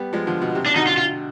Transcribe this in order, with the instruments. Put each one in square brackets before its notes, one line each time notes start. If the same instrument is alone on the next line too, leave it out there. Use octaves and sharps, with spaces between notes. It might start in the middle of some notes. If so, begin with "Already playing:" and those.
Already playing: [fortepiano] G3 B3
F3 G#3
D3 F3
B2
C3
[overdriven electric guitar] D4
[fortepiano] B2 D3 [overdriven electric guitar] D#4
[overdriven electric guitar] F4
F4